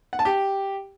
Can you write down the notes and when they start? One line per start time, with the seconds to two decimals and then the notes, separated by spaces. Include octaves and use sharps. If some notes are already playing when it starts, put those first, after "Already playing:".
0.13 F#5
0.19 A5
0.25 G4